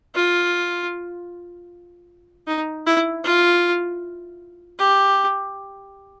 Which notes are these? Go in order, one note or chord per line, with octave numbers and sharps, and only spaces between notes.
F4
D#4
E4
F4
G4